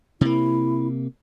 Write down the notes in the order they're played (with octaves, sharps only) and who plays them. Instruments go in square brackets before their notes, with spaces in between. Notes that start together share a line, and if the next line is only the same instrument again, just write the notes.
[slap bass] C3 A#3 [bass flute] E4